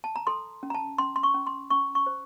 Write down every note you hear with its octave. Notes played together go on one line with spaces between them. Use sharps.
A5
A#5
A4 C6
C#4
A#5
A5
C#4 C6
C6
C#6
C#4
C6
C#4 C#6
C#6
C5